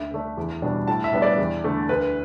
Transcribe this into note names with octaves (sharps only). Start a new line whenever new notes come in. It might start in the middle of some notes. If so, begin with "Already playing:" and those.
Already playing: D2 E5
D3 A3 D4
E2
B2 G3 D4
A2 A5
E5
G3 B3 D4
D5
E2
D3 A3
D2 B4